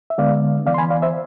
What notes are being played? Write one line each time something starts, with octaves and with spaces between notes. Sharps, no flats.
E5
D3 G#3 B3 D5 F5
E3 B3 D5 F5
C6
G#5 B5
D5 F5
C5 E5